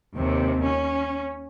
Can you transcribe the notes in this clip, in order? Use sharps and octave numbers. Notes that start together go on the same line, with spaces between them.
D#2 C3
C#4